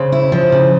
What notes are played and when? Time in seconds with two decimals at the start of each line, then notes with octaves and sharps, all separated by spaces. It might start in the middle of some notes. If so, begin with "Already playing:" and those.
Already playing: C#3 C5 C#5
0.12 E4
0.32 F3
0.52 C#3